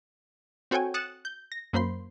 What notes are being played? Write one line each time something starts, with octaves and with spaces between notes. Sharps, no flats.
C4 F#4 A4 C#5 G5 G#5
D#6 F#6 A6 C#7 E7
G6
A#6
F#2 A#3 C5 B5 C6